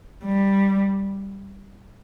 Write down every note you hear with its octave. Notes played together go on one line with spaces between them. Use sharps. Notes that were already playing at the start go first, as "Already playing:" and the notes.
G3